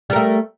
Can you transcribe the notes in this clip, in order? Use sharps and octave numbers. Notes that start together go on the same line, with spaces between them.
G3 A3 A#4